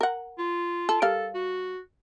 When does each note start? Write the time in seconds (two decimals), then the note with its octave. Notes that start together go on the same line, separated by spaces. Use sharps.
0.01 A#4 F#5
0.39 F4
0.89 A4
1.02 G3 A4 A#4 F5
1.35 F#4